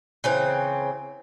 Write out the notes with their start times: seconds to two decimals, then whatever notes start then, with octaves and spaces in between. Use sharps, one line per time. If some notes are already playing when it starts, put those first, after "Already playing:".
0.24 C#3 E3 C4